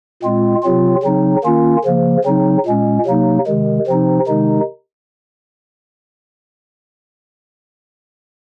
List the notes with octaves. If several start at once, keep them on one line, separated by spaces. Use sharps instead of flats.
A#2 G#3 C4 F4
C3 F#3 C4 F4
C#3 F#3 C4 D#4
D#3 A#3 C#4 F4
C#3 F3 A#3
C#3 F#3 C4 D#4
A#2 G#3 C#4
C3 F#3 A#3 D#4
C3 D#3 G#3
C3 F3 C4 D#4
C3 D#3 G#3 D#4